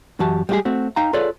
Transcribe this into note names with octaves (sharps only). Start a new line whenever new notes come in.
F#2 E3 F#4 G4 A5
G3 G#3 C4 F4 G4 G#4
A3 C4 F#4
D#4 F5 G5 A#5
F4 G#4 A4 B4 C#5 D5